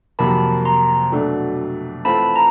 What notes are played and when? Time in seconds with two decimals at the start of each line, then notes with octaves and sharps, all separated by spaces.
0.19 F2 C3 D#3 F#3 A#3 A5 B5
0.65 A#5 C6
1.12 B2 F#3 A3 D4
2.05 E3 A3 C4 F4 A5 B5
2.36 A#5